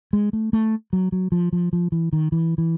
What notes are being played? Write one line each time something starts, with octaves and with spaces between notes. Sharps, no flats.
G#3
A3
A3
F#3
F#3
F3
F3
F3
E3
D#3
E3
E3